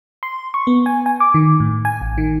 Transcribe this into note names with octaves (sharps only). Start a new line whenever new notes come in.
C6
C#6
B3
G#5
G#5
D6
D#3
A2
G#5
A1
D#3